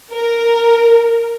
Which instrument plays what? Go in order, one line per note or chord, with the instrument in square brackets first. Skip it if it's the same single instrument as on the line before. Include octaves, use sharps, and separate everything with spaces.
[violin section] A#4